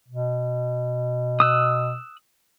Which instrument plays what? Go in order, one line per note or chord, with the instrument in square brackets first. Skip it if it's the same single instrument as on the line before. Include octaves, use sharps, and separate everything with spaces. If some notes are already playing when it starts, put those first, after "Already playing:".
[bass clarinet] B2
[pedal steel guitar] D#6 E6 F#6